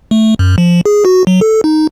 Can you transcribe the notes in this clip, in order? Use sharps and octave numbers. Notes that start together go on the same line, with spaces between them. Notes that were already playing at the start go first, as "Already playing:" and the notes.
A3
F#2
F3
G#4
F#4
F#3
A4
D#4